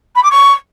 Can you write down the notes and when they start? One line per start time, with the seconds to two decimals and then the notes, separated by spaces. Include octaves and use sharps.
0.15 B5
0.23 D6
0.30 C#6